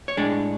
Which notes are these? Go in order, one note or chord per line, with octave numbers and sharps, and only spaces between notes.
C#5
A2 G#3 D4 D5